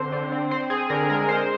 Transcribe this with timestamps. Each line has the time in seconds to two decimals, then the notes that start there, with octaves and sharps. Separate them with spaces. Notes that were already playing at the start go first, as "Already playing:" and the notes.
Already playing: D3 C4 C5
0.12 D3
0.32 C4
0.51 C4 C5
0.70 C4 G#4
0.90 D3 A#4
1.10 G#3 A#4
1.29 G#3 C5